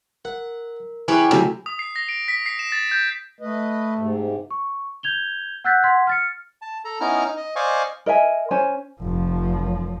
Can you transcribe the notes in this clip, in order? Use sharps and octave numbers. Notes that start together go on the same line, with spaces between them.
A#4 F#5
E3 C#4 G4 G#4 B4 C#5 G#5 B5
C3 F#3 A3 G4
D#6
C7
A#6
D7
B6
C7
E7
A6
G6
A3 B4 D#5
G#2 C3
C#6
G6 G#6 F7 G7
F#5 E6 F#6 G6 A6 B6
F#5 C6 G#6 B6
F6 A6 C#7
A5
A4 A#5
B3 C#4 D#4 E4 A#5 F6
D#4
D#5
C5 D5 D#5 F5 G#5 C#6
A#4 D#5 E5 G#5
C#4 C5 G#5
F1 F3